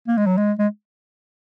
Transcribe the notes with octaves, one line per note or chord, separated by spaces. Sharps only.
A#3
G#3
F#3
G#3
G#3